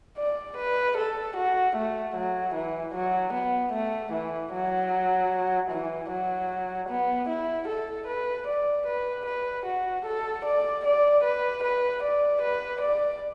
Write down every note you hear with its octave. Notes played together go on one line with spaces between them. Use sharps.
D5
B4
A4
F#4
A3
F#3
E3
F#3
B3
A3
E3
F#3
E3
F#3
B3
E4
A4
B4
D5
B4
B4
F#4
A4
D5
D5
B4
B4
D5
B4
D5